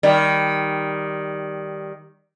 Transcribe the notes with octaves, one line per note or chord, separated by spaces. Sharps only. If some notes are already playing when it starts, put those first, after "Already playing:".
D#3 G3